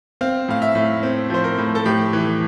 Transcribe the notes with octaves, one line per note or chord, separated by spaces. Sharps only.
C4 F5
A2 F5
E5
A2
C4
F3 C5
A#4
A2
A4
A2 G4
E3